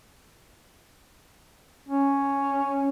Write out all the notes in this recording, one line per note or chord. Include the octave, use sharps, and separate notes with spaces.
C#4